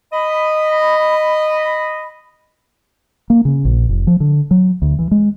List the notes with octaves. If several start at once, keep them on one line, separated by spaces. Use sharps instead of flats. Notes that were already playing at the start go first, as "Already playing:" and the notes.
D#5 B5
A#3
C#3
A#1
F1
F3
D3
F#3
D2
E3
G#3